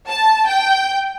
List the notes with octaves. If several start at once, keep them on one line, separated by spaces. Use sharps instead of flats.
A5
G5